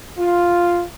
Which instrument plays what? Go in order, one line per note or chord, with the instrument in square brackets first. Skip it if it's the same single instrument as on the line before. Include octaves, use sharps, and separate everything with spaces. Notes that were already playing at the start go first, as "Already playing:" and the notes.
[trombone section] F4